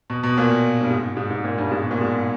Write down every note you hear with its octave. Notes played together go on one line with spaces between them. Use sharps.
B2
B2
A#2
G2
G#2
G#2
G#2
A#2
G2
G#2
B2
A#2
G#2